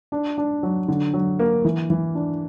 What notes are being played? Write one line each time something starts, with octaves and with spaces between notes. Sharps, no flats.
D4
D4
F#3
D3
F#3
A#3
E3
E3
D4